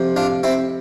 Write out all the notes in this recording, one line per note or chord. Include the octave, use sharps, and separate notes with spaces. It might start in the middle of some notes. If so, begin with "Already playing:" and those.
Already playing: F2 C3 F3
D4 F4
C4 E4